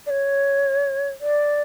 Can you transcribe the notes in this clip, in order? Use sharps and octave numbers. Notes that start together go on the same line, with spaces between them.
D5
C#5
D5